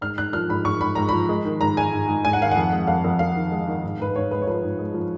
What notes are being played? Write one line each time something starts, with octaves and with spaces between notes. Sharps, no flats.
G#2 F6
G#2 F#6
F3 F6
G#2 B5
G#2 C#6
G#2 B5
G#2 A#5
F3 B5
G#3
D#3
G#2 A#5
G#3 G#5
G#2
G#2
G#2 G#5
F#5
D#3 F5
F2 F#5
G#3
F2 F5
F2
F2 F5
D#3
G#3
D#3
G#2
G#2 B4
G#2 C#5
G#3 B4
C#5
F3 B4
G#2
G#3
F3